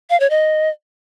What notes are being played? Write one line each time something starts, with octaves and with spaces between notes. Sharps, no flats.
F5
C#5
D#5